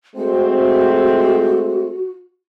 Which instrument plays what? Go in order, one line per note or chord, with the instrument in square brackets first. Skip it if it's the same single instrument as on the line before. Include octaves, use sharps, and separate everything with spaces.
[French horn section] G#3 A3 C4 [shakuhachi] F#4